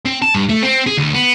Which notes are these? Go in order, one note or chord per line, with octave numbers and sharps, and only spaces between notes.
C4
A5
G2
A3
C4
G#4
D2
B3